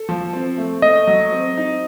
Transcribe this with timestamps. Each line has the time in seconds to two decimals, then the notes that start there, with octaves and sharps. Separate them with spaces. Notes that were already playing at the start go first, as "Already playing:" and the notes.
Already playing: A4
0.09 F3
0.33 C4
0.58 A3
0.82 A3 D#5
1.07 F#3
1.32 C4
1.57 D#4